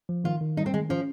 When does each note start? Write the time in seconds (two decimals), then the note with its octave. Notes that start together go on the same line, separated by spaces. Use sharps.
0.09 F3
0.24 D#3 F4
0.41 D#3
0.57 G3 D#4
0.66 C4
0.73 D#3 G#3
0.89 F3 C#4